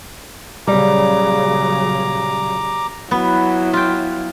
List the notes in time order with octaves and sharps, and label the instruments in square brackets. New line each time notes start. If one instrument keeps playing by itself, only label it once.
[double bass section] A#2 C#3 F#3 [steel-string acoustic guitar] G3 [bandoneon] A#5 D6
[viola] F#3 E4 [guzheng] B3
[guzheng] F4 G5